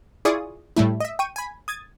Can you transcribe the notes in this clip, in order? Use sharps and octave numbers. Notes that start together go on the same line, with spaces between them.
E4 F4 G#4 D5 C#6 D#6
A2 G3 A3 E4
D#5 E5
G5 C#6 D#7
G#5 B5
D#6 G#6 A6 D#7